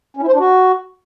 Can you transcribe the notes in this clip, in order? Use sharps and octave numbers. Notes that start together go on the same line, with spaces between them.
C#4
E4
C5
D4
F#4